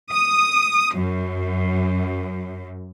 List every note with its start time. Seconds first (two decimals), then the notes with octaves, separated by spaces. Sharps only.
0.10 D#6
0.94 F#2